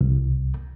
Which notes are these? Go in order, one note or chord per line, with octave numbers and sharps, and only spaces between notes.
C2